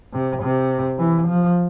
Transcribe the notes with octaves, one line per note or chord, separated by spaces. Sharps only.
C3
C3
E3
F3